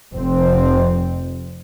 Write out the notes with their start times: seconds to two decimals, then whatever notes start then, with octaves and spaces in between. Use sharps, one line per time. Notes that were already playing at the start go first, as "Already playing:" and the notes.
0.15 F1 F2 C4